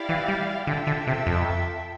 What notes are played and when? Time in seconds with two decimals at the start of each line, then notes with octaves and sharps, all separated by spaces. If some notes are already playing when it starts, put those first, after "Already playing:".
Already playing: E4 G4 D5 F5
0.09 E3
0.28 G3
0.67 D3 F4 A4 E5 G5
0.87 D3
1.07 C3
1.27 F2